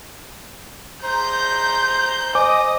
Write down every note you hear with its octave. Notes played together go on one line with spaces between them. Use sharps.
C5 A#5 G6
C5 D#5 G#5 D6